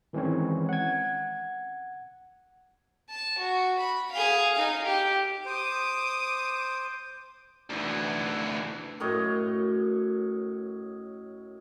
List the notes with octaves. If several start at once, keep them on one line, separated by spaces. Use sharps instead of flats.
D#3 E3 G#3 C4 C#4 C#5
F#5 G#6
A5
F#4
B5
G#4 F5
D#4 F5
G4
C5 D6 D#6
D2 E3
F#2 A2 C#5 D#5